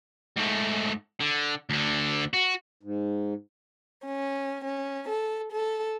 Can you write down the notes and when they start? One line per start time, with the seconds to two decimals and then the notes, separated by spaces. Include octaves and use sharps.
0.37 G#2 A3
1.20 D3
1.70 D2 D3
2.33 F#4
2.83 G#2
4.05 C#4
4.64 C#4
5.08 A4
5.51 A4